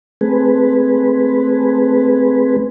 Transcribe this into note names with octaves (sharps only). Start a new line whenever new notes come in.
A3 C4 G#4 B4